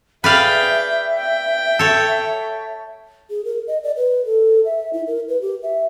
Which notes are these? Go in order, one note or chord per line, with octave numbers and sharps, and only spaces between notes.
G#4 B4 D5 E5 F5 G5
G5
A4 C#5
G#4
A#4
D#5
D5
B4
A4
E5
E4
A#4
B4
G4
E5